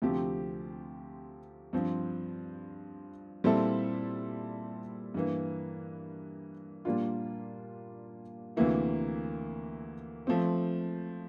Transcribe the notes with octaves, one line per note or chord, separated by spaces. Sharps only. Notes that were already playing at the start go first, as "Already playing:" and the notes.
D2 C3 F3 C4 G4
G2 F3 C4
A#2 G3 C4 E4 A4
G2 E3 A#3
A#2 G3 A#3 D4 F4
D2 C3 E3 A#3 E4
F3 A3 C4